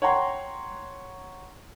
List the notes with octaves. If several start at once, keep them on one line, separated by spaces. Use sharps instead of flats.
C#5 F#5 G5 A#5 C6